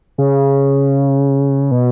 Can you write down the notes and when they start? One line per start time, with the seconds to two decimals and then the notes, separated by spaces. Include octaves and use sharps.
0.18 C#3
1.71 B2